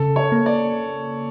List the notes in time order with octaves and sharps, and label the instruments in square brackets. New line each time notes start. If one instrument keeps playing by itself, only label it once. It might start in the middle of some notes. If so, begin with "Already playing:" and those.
Already playing: [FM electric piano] C#3 [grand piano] A4
[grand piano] C#5
[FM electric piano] A#3
[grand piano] D5